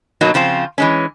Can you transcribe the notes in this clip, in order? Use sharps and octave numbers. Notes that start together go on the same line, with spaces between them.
B2 F#3 A#3 D#4
C#3 F3 C4 F4
E3 G#3 C#4